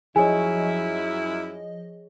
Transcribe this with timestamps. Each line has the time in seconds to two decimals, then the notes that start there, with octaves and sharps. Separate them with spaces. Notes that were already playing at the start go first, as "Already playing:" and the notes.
0.16 F#2 F3 E4 G#4 C#5 D#5 G#5